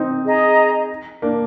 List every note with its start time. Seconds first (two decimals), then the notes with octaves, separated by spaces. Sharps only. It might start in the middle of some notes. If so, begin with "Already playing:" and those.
Already playing: C4 D#4
0.24 G#4 D#5 A#5
1.22 A#3 D4